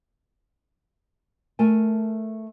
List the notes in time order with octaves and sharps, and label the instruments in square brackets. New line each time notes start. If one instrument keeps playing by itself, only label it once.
[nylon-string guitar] A3 A#4 G#5